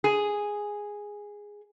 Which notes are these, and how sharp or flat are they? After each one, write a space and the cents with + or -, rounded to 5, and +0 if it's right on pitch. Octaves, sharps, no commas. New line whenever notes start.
G#4 -5